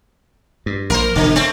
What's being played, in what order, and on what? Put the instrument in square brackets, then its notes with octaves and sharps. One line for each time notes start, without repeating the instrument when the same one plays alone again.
[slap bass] G2
[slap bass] A#1 [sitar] A#4 C5
[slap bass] E1 B2 [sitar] D3
[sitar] A3 C4